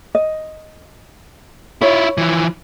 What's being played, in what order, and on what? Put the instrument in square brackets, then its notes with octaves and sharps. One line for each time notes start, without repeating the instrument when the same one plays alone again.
[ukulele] D#5
[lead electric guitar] E4 F4 [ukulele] C#5
[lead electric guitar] E3 F3